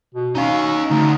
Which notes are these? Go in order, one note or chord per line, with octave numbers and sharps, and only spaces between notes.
B2
C#4 D#4 F5
D2 D#4